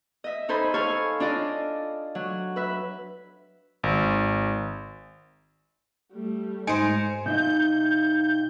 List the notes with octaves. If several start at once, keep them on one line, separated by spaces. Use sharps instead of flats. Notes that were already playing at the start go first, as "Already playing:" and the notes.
D#5 E5
D#4 A4 C5 G#5 B5
A4 C#5 F5 G#5
D4 F4 D5 D#5
F#3
B4 E5
G#1
G3 A3
G#2 D#4 C5 G#5 C6 C#7 D7
C3 D#4 F4 G6